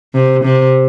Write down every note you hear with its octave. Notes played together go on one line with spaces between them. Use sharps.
C3
C3